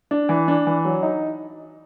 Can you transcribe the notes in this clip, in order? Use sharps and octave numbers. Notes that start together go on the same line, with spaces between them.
D4
E3
D4
E3
F#3
D#4